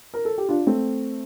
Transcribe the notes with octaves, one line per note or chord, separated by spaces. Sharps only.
A#4
A4
G4
D4 F4
A3 C4